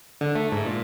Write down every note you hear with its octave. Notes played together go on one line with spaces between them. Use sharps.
D3
A3
G#2
A#2